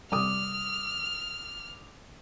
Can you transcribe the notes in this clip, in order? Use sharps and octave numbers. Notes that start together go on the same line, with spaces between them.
C3 G3 D6 D#6 F6